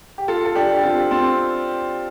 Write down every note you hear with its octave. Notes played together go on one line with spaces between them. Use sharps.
G4
F4 A4
A4
D4 G4
G4
C4 F4
C4 F4